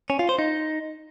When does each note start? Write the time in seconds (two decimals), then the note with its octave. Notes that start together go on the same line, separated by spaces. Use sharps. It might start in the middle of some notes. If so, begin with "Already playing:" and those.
0.10 C#4
0.19 F4
0.29 C5
0.39 D#4